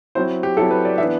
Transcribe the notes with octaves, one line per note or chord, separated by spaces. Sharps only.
F#3 C4 E4 C5
G4
F#3 C4 E4 A4
B4
D5
E3 B3 D4 E5